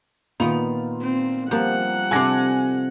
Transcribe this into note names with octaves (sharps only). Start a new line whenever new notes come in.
A#2 D#3 B3 D#4 F4 F7
C4
F3 G3 A#3 C4 G4 F#5
C3 D4 A4 G#5 G#6 A#6